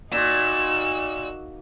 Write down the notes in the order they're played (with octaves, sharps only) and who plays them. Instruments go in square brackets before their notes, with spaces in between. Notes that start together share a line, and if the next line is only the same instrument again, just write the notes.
[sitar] A#2 [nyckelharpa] D#4 F#4 [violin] E6